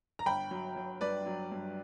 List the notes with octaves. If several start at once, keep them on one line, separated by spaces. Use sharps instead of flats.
A#5
G1 G5 B5
F#3
F#3
G2 B4 D5
F#3
G2